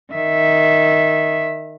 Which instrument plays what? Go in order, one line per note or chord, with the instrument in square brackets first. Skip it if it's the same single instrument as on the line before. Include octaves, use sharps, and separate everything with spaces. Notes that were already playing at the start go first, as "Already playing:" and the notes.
[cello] D#3 E5